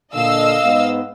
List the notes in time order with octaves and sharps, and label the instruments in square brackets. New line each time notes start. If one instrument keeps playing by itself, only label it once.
[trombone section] A#2 D3 [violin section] D#5 F5 E6
[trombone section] G#2 G#3 B3